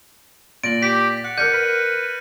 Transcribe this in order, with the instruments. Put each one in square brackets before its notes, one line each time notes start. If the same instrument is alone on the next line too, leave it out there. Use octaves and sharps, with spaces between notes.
[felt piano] A#2 [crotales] A6 A#6 F#7 [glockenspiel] D7
[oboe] G4 [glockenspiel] B6
[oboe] F#5 [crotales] F#6
[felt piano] A#4 D5 [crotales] F6 C#7 D#7 [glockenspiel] G6
[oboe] B4